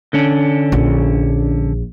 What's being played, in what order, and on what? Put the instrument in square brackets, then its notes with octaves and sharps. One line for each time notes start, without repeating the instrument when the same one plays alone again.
[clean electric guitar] D3 C#4 D4
[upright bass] A#1